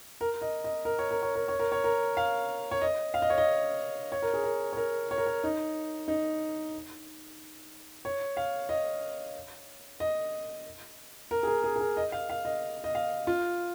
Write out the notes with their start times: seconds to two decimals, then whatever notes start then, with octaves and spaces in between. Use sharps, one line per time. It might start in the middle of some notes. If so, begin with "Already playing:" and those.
0.21 A#4
0.42 D#5
0.64 D#5
0.85 A#4
0.99 C#5
1.11 A#4
1.22 C#5
1.35 A#4
1.48 C#5
1.59 A#4
1.72 C#5
1.84 A#4
2.17 F5
2.71 C#5
2.81 D#5
3.14 F5
3.22 D#5
3.30 C#5
3.38 D#5
4.12 C#5
4.22 A#4
4.34 G#4
4.44 A#4
4.73 C#5
4.77 A#4
5.11 C#5
5.18 A#4
5.26 C#5
5.44 D#4
6.08 D#4
8.05 C#5
8.37 F5
8.69 D#5
10.00 D#5
11.31 A#4
11.43 G#4
11.47 A#4
11.64 G#4
11.76 G#4
11.80 A#4
11.97 D#5
12.12 F5
12.30 F5
12.45 D#5
12.84 D#5
12.95 F5
13.27 F4